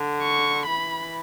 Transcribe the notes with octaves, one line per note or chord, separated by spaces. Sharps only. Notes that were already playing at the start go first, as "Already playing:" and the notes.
Already playing: D3
C#6
E3 B5